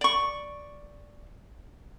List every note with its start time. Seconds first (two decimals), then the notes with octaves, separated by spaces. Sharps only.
0.01 D5 C#6